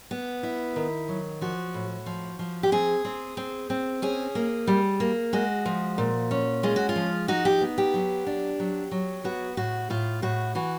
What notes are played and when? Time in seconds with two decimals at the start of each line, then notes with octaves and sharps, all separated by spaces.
0.11 B3
0.43 E4
0.76 D#3
1.08 F#3
1.41 F3 F#4
1.74 A2
2.06 F3
2.39 F3
2.63 G4
2.72 C4 G#4
3.05 C4
3.37 C4
3.70 C4
4.02 C#4 G#4
4.35 A#3
4.67 G3
5.00 A#3
5.33 G#3 F#4
5.66 F3
5.98 A#2
6.31 C#4
6.63 G#3 F4
6.76 F#4
6.89 F4
6.96 F3
7.28 D#4 F#4
7.45 G4
7.61 B3
7.78 G4
7.94 F#3
8.26 D4
8.60 F#3
8.91 F#3
9.24 B3 F#4
9.57 A2 F#4
9.90 A2 F4
10.22 A2 F#4
10.55 E3 F#4